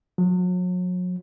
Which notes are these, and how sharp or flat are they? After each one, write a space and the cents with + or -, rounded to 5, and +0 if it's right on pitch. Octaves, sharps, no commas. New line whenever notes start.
F#3 -40